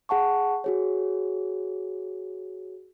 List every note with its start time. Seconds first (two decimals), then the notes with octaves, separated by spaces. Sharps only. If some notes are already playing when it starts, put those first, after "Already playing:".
0.09 G#4 F#5 A5 C#6
0.64 F#4 G#4 C#5